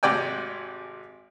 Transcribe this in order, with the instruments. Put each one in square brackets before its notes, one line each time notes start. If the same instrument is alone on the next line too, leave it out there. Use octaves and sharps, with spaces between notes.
[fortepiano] G#1 C3 F#4 D5 G5 G#5